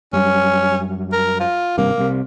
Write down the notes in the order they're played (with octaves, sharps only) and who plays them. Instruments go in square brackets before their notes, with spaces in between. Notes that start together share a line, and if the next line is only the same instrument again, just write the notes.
[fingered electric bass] F#2 G3 [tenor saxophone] C#4
[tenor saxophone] A#4
F4
[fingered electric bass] G#1 G2 C3 [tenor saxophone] A#3
[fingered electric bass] C2 C3